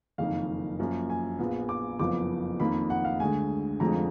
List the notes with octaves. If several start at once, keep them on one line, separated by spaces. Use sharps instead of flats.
F#1 F2 D#3 F5
F#2 F3 A#3
G#5
A#1 A#2 F3 B3
D6
F#1 F2 F3 B3 D6
F2 D#3 A#3 B5
F#5
F5
D2 D3 G#3 G#5
F1 F2 D3 F3 G#3 A#5